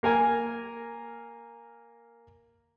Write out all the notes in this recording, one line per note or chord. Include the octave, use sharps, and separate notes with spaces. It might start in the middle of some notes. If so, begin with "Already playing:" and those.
A#3 A#4 G#5